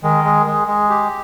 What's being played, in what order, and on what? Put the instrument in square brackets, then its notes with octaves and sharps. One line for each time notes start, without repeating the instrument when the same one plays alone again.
[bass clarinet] D#3 [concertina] G#3
[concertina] G#3
G#3
G#3
G4